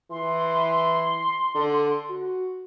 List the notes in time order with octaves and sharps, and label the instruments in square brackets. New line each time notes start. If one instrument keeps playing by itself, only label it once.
[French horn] E3 [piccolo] C6
[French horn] D3
F#4